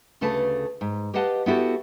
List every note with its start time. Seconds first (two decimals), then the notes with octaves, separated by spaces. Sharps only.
0.21 D2 C#3 A3 B4 A5
0.81 G#2
1.14 G4 B4 D#5 F5 F#5 A5
1.46 B3 E4 F#4 G4 A4